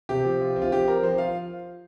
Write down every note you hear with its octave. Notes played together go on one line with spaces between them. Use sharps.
C3 G4
F3
F4
C4
F4
F3 G4
C4 A#4
F3 C5
F4 F5